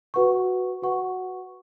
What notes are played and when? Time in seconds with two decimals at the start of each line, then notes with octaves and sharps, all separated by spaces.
0.14 F#4 B4 F#5 C#6
0.82 F#4 B4 F#5 C#6